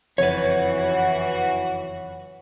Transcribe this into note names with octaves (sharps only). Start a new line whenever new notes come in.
F#1 F2 E3 F#4 B4 C#5